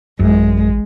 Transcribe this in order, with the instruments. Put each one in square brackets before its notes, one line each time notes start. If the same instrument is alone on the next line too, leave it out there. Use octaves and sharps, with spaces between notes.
[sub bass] A1 [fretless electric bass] F#2 [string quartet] G#3